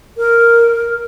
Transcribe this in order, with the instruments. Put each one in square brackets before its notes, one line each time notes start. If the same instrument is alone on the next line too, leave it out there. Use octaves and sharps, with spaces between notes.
[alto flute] A#4